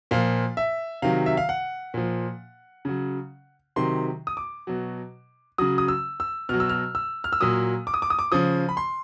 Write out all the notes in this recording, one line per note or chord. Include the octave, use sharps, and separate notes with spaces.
A#2 F3 F5
E5
C3 D#3 F#3 F5
E5
F5
F#5
A#2 F3
C#3 F#3
C3 D#3 F#3 C6
D#6
D6
B2 F#3
C#3 F#3 D#6
D#6
E6
E6
B2 F#3 F6
E6
F6
E6
F6
E6
A#2 F#3 D#6
D6
D#6
D6
D#6
D6
C#3 F3 D#6
B5
C6